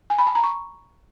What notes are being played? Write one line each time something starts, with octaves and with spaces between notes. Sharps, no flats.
G#5
B5
A5
A#5
C#6